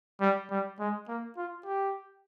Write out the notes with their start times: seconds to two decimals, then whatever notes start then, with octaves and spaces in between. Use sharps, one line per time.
0.21 G3
0.51 G3
0.79 G#3
1.08 A#3
1.37 F4
1.66 G4